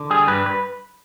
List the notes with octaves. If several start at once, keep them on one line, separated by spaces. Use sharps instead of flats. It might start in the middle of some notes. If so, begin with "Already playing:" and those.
Already playing: D3
G3 G#4
G2 B4
B4